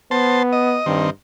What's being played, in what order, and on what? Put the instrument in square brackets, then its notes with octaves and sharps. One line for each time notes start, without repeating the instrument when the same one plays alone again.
[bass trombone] B3 [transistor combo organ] C5 A5
[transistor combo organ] D#5
[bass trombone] G2 [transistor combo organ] D#3 C4